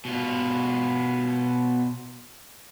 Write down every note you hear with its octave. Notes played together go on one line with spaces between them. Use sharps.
B2 F4